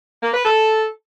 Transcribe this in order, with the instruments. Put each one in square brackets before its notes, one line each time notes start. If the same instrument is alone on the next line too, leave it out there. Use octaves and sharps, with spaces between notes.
[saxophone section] A#3
B4
A4